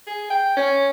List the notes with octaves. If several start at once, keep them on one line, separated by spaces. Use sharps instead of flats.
G#4
G5
C#4